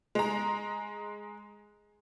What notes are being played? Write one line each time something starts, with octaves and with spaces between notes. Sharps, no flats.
G#3 A#5